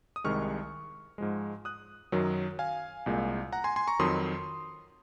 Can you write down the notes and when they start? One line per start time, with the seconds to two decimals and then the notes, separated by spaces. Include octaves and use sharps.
0.16 D#6
0.24 C2 C3 D#3 G#3 C#6 F6
1.18 G#2 F3 G#3
1.65 D#6 F#6
2.12 F#2 D#3 F#3
2.59 F5 G#5
3.06 C2 A#2 G#3
3.52 F#5 A#5
3.64 G#5 C6
3.76 G#5 C6
3.88 A#5 C#6
3.99 F2 D#3 F#3 C6 D#6